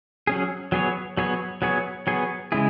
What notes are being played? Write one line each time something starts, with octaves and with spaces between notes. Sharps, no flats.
F#3 C#4 G#4
F#3 B3 G#4 C#5
F#3 B3 G#4 C#5
F#3 B3 G#4 C#5
F#3 B3 G#4 C#5
C#3 G#3 E4 G#4